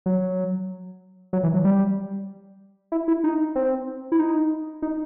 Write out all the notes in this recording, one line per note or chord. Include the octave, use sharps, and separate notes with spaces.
F#3
F#3
E3
F#3
G3
E4
E4
D#4
C4
E4
D#4
D#4